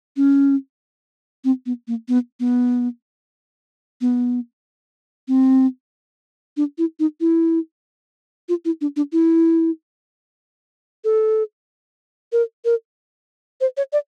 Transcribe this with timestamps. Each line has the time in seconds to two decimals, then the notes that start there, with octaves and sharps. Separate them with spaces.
0.17 C#4
1.44 C4
1.66 B3
1.88 A#3
2.08 B3
2.40 B3
4.01 B3
5.28 C4
6.57 D4
6.78 E4
7.00 D#4
7.20 E4
8.49 F4
8.65 E4
8.81 D4
8.96 D4
9.12 E4
11.04 A4
12.32 A#4
12.65 A#4
13.61 C5
13.77 C#5
13.93 D5